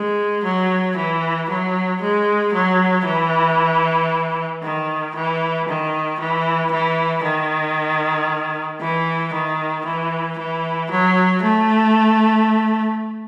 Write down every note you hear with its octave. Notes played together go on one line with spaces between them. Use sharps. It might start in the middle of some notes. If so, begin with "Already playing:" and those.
Already playing: G#3
F#3
E3
F#3
G#3
F#3
E3
D#3
E3
D#3
E3
E3
D#3
E3
D#3
E3
E3
F#3
A3